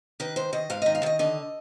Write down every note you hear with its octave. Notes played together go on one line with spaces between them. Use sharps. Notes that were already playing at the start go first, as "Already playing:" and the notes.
D#3 B4
G#2 C5
D#3 D#5
G#2 F5
D#3 D#5
F5
D#3 D#5
D3 D#5